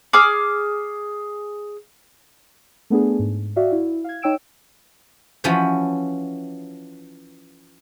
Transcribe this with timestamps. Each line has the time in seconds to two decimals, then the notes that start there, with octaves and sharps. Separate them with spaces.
0.13 G#4 D6 F6
2.90 A3 B3 D4 G#4
3.19 G#2
3.56 F#4 D5 E5 F5
3.72 E4
4.04 F5 G#6
4.22 D#4 C#5 G5 E6 D7 E7
5.44 E3 F3 C#4 F#4 B4 C5